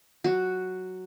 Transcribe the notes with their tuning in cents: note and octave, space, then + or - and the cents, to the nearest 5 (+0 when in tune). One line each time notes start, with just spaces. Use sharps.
F#3 +0 F#4 +0